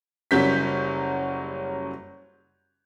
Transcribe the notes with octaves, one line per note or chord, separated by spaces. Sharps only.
F#1 F#3 G3 C#4 G6 B6